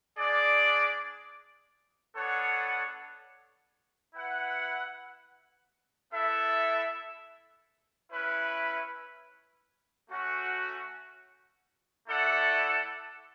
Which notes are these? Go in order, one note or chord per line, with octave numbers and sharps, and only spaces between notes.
G#3 D4 G#4 D5
B3 D4 A4 C#5 F#5
E4 B4 F#5
B3 E4 A4 E5
C#4 E4 B4
A3 C#4 F#4
A3 E4 A4 D5 F#5